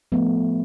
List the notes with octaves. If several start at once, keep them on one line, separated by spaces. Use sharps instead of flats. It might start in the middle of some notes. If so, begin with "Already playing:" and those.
F3 A3 B3